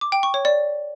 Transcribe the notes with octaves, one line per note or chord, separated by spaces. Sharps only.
D6
G5
C#6
C#5
D5